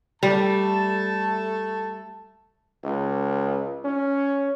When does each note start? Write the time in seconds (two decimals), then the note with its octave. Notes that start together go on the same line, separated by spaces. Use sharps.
0.23 G3 A3 A5
2.84 C#2
3.84 C#4